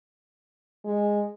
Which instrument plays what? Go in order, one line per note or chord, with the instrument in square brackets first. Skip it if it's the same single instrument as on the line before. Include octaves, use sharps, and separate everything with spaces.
[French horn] G#3